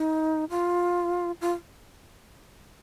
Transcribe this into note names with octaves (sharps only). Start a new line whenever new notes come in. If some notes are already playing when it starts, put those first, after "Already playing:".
Already playing: D#4
F4
F4